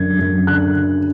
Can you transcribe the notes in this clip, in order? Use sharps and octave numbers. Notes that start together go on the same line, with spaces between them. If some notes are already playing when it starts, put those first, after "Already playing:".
Already playing: F#2 D3 G#6
F#2
D3 F#6
D3